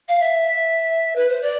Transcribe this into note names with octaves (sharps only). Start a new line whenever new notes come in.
F5
E5
B4
C5
D5